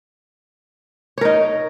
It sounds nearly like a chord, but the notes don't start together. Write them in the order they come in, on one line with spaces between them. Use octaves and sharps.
C#5 A#4 D#4